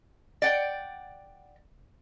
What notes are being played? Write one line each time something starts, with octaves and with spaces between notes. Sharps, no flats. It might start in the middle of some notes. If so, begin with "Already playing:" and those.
D5 F#5 G5